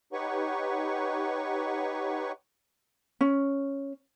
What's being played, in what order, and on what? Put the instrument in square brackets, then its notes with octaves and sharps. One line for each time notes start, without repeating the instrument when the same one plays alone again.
[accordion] D#4 G4 B4 C#5 F#5 C#6
[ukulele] C#4